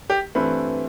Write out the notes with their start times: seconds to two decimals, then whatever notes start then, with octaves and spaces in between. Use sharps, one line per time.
0.10 G4
0.35 G2 E3 A3 C4 B4